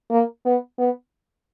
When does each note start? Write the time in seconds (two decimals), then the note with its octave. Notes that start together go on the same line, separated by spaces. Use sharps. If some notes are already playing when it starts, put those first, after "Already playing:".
0.11 A#3
0.45 B3
0.78 B3